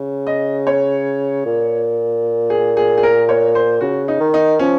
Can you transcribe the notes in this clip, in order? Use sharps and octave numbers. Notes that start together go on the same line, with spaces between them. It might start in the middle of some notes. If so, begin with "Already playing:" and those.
Already playing: C#3
D#5
C#5
A#2
G#4
G#4
G#4
A#4
C#5
C5
C#3 F#4
D#4
D#3
D#4
F3 C#4